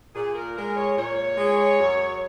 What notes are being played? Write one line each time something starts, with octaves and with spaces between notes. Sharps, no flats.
A#2 G#4
A#4
G#3 A#4
C#5
A#2 C#5
G#3
F#2